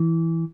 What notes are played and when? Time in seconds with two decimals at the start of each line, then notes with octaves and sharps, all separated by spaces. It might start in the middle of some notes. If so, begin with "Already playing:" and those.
Already playing: E3